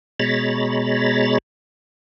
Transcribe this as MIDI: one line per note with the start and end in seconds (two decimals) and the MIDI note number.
0.20 1.38 47
0.20 1.38 56
0.20 1.38 73
0.20 1.38 82
0.20 1.38 83
0.20 1.38 93